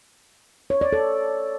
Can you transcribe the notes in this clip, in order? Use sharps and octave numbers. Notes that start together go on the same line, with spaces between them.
C#5
D5
A4